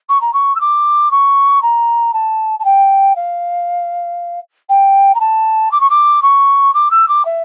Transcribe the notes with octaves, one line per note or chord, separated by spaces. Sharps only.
C#6
A#5
C#6
E6
D6
C#6
A#5
A5
A5
G5
F5
G5
A#5
A5
D6
C#6
D6
C#6
D6
E6
D6
E5